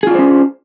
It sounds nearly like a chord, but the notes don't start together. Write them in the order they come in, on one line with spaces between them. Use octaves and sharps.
G#4 F4 D4 C5 C#4